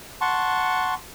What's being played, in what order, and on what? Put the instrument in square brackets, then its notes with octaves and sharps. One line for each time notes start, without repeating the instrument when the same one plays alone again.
[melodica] F#5 A5 C6 C#6